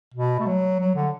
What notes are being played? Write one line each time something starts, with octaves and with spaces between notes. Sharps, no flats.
B2
A3
F#3
F#3
D3